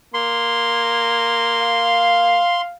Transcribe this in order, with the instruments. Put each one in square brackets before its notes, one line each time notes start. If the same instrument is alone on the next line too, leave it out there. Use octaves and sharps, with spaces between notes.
[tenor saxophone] A#3 [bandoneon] C6
[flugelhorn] F5